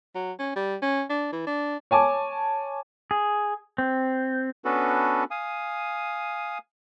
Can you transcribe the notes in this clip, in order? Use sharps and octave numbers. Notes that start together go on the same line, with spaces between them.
F#3
C#4
G3
C#4
D4
E3
D4
C#5 G#5 A5 D6
G#4
C4
B3 C#4 D4 F#4 A4 B4
F5 G#5 D#6